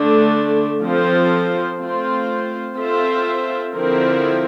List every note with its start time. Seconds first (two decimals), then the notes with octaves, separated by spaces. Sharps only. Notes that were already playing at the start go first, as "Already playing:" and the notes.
Already playing: D3 A3 D4
0.80 F3 C4 F4 A4 C5
1.78 A3 C4 F4 C5
2.76 C4 F4 A4 C5 E5
3.73 D3 F3 C4 E4 A#4